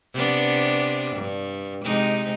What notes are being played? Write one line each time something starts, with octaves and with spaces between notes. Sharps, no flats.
C3 B3 D4
G2
C3 G#3 D#4